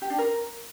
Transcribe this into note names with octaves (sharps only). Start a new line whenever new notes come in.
G4
D4
A#4